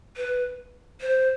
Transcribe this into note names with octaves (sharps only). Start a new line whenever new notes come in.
B4
C5